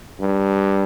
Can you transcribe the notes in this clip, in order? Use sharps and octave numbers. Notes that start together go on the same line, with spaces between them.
G2